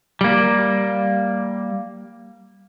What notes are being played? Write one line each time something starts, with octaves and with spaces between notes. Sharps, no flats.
G3 A#3